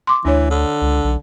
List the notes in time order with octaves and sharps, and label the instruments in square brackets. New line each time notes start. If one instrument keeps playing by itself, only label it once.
[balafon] C6 D6
[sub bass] D2 [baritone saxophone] E3 [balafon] D4 C#5
[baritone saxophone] D3
[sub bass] C#2
B1